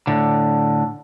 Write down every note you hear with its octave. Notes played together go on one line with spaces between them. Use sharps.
A2 D3